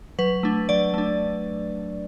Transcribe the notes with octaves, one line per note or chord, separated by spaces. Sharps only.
F#3 B4
A3 D4
F#3 D5
A3 D4